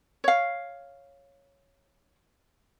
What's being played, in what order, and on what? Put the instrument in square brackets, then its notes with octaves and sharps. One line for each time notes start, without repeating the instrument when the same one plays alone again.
[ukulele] C#5 F5